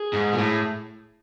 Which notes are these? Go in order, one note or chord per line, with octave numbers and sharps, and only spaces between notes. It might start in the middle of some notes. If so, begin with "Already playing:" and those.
Already playing: G#4
G#2
A#2
A2